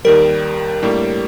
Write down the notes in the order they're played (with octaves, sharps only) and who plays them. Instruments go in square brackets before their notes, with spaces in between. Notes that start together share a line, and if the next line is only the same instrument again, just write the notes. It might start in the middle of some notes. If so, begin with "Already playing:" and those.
[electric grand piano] D#2 D#3 G3 [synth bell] A#4
[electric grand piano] A2 G3 A#3 D4